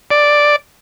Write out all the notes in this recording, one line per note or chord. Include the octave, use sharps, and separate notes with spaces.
D5